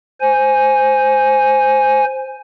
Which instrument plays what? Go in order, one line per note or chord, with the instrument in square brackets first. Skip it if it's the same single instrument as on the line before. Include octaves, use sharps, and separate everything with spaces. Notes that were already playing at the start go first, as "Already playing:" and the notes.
[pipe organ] C5 G#5